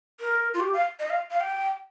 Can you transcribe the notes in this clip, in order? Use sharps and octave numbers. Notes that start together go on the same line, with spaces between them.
A#4
F4
G4
F5
D#5
F5
F5
G5